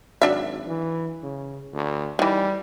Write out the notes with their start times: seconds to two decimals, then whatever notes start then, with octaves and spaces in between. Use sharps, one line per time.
0.22 G#1 F#3 D4 E5
0.67 E3
1.22 C#3
1.73 D2
2.19 D#3 E3 G3